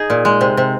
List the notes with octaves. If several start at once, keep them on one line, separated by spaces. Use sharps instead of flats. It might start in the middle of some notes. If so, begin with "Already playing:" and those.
Already playing: D#4 G#4
A#2
G#3
C3
C3